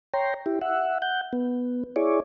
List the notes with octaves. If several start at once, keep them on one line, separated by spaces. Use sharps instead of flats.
C#5 G5 A#5 C6
E4 G4
E5 F#5
F#5 G6
B3
E4 G#4 C#5 D5